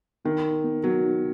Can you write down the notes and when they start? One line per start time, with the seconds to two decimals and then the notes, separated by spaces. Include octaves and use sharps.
0.25 D#3 B3
0.45 D#4
0.64 B3
0.84 F#3 B3
1.04 D#4